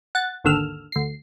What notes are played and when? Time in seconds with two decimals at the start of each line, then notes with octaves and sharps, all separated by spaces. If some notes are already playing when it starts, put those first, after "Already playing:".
0.15 F#5 A6
0.44 G#1 D#2 D3 E6 F6
0.92 D2 C7